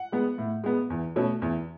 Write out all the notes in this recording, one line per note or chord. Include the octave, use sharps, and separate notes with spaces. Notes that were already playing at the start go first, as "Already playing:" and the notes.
Already playing: F#5
G#3 B3
A2
G#3 B3
E2
B2 A3 C#4
E2